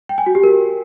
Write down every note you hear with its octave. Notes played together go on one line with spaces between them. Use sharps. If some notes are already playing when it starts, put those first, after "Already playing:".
G5
G#5
F#4
G4
A#4